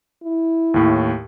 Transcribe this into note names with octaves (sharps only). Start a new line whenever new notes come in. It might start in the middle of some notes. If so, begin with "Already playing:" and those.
E4
D#2 A2